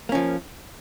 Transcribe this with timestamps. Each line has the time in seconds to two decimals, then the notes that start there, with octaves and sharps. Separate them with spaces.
0.09 A#3
0.12 C#4
0.15 F3